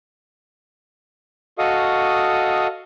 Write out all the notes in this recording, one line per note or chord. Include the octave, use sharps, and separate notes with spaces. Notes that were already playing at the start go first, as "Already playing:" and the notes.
F#4 A4 D#5 F5 C#6 D#6